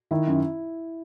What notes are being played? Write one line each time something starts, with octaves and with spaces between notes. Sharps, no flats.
D#3 E4
F#2